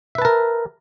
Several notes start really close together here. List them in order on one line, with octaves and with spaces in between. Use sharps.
E5 B4 A5 A#4